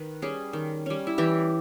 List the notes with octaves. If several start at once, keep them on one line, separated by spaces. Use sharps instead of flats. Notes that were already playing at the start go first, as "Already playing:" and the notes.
Already playing: D#3 B4
G3 C#4 G#4
D#3
G3 C#4
E4
E3 G4